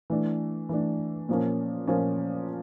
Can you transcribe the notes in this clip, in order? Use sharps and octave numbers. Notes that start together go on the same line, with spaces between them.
E3 A3 D4
E3 A3 D4
A#2 F3 A#3 C#4
A#2 F3 A#3 C#4